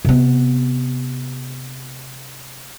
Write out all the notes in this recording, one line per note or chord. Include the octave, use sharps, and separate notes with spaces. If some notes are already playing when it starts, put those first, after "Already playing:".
C3 B3